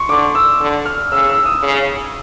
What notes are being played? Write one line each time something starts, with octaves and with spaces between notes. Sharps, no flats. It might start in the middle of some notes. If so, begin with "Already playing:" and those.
Already playing: C6 C#6
D3 D6
E6
D3
F6
C#3 E6
E6
D#6
C#3